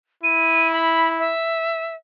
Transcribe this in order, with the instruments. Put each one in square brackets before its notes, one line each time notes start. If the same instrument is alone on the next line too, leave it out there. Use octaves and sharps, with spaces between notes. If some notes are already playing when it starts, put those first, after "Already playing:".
[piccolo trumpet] E4 [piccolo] D#7
[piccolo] B5
E5